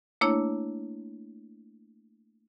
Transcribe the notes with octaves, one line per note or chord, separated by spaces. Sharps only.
A3 A#3 D4 E4 C#5